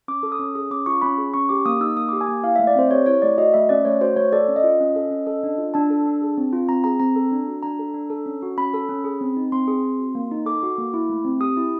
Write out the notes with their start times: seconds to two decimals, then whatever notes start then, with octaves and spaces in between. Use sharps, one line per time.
0.08 C#4 D6
0.23 A4
0.32 D#6
0.39 C#4
0.55 G#4 D#6
0.71 C#4 D6
0.86 F4 C#6
1.02 C#4 B5
1.18 G#4
1.34 C#4 C#6
1.49 G4 D6
1.66 A#3 D#6
1.80 D#4 E6
1.97 A#3 D#6
2.09 G4 D6
2.21 G#5
2.28 A#3
2.43 E4 F5
2.56 A3 E5
2.67 D5
2.75 C4 C5
2.91 G4 C#5
3.06 E4 C#5
3.22 A3 D5
3.38 F#4 D#5
3.53 A3 E5
3.69 C#4 D5
3.85 A3 C#5
4.01 F#4 C5
4.17 A3 C#5
4.33 A4 D5
4.48 C#4
4.56 D#5
4.64 F4
4.80 C#4
4.96 A4
5.11 C#4
5.27 A4
5.43 D4
5.58 F4
5.74 D4 A5
5.90 A4
6.06 D4
6.22 G#4
6.37 C4
6.53 F4
6.69 C4 A#5
6.84 G#4 A#5
7.00 C4 A#5
7.16 A4
7.32 D4
7.48 F#4
7.63 D4 A#5
7.79 A4
7.94 D4
8.10 A4
8.26 C#4
8.42 F#4
8.57 C#4 B5
8.74 A4
8.89 C#4
9.04 G#4
9.21 C4
9.37 D#4
9.52 C4 C6
9.68 G#4
9.83 C4
9.99 F#4
10.15 A#3
10.31 D#4
10.46 A4 D6
10.63 F#4
10.78 A#3
10.94 E4
11.10 A3
11.25 C4
11.40 G4 D#6
11.57 E4